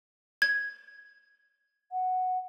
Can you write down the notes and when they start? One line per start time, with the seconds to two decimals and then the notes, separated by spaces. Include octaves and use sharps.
0.42 G#6
1.92 F#5